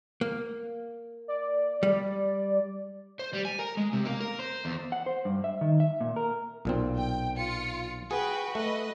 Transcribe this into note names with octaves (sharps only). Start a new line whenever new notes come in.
A#3
D5
G3
C5
G3
G#5
A#4
G#3
C3
A#3
A#4
C5
E2
F#5
C5
G2
E5
D#3
E5
A#2
A#4
B1 A#2 C4
G5
F4 C#7
F#4 G#4 B4 G5
A3 B4 D#5